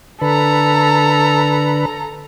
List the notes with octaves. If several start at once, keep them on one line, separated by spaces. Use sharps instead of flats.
D3 A4 B4 A#5